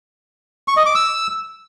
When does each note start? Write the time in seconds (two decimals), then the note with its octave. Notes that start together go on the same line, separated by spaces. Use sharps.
0.68 C#6
0.77 D#5
0.86 D6
0.95 E6